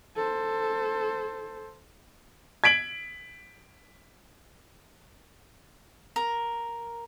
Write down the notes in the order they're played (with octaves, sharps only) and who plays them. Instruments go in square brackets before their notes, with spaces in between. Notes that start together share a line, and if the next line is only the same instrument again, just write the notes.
[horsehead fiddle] A4 C5
[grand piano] G#6 B6 D7 F#7
[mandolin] A#4